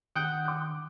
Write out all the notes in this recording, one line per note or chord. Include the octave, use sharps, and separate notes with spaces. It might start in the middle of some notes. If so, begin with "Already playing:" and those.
D#3 F#5 G5 D#6 F#6 G6
D6 F#6